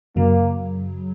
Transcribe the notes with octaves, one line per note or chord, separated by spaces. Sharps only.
F#2 C#3 F#3 A#3